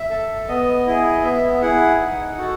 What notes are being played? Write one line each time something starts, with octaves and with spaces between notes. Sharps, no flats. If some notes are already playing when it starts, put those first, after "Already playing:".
Already playing: E5
A4
B3 D#5
E4 G#4
B3 E5
E4 G#4 F#5
D#4
F#4 A4